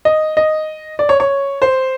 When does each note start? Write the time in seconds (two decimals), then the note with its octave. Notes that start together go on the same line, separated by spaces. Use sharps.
0.05 D#5
0.37 D#5
0.99 D5
1.09 C#5
1.20 C#5
1.62 C5